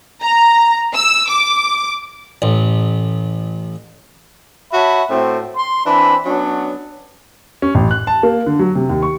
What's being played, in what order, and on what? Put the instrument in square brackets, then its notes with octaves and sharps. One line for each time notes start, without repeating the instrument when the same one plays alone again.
[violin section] A#5
E6
D6
[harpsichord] A1
[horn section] F#4 C#5 E5 A5 B5
A2 A3 C4 F#4
C6
E3 C4 D4 B5
F#3 B3 C#4 D4
[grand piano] C#4
A1
F#6
A5
A#3
D3
F#3
C3
D#2
C#6